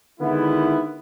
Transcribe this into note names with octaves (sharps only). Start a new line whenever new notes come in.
D3 D#3 G#3 B3 E4